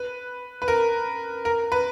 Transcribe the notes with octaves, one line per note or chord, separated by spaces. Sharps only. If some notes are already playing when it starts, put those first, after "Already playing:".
Already playing: B4
B4
A#4
A#4
B4